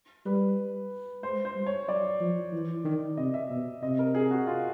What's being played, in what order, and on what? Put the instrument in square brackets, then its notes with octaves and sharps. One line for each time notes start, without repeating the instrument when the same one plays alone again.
[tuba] G3 [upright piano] B4
[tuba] G#3 [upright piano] C5
[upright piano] C5
[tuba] G3
[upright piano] C#5
[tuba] F#3 [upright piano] D5
[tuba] F3
E3
D#3
[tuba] C3 [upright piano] D#5
[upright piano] E5
[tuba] B2
[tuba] C3 [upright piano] D#5
[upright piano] A#4
G#4
F#4
F4